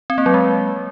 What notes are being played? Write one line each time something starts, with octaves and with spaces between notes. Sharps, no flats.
C4
A#3
F#3
G#3